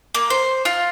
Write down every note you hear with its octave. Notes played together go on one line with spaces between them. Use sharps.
A#3
C5
F4